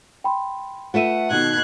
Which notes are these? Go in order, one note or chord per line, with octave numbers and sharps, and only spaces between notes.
G5 B5 C6
A3 F4 B4 E5 F#5 D#7
B2 D#3 F#6 G#6